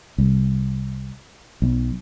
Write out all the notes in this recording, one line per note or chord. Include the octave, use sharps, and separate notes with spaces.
C2
B1